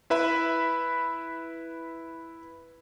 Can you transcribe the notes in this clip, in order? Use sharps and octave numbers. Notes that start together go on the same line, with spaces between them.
E4 B4 E5 B5